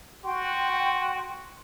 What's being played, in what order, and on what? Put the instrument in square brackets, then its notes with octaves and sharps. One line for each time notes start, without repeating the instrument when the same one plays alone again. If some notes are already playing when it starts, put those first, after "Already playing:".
[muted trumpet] F#4 [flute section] G5 C6